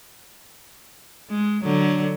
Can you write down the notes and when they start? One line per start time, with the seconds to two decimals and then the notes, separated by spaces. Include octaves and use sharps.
1.30 G#3
1.64 D3 F#3